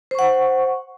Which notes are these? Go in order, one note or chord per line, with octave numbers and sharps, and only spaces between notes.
C5 F#5 C#6